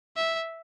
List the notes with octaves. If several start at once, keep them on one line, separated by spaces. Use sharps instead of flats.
E5